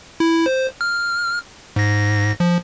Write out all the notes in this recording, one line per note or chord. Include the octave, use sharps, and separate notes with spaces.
E4
C5
F6
G#2 A#6
F3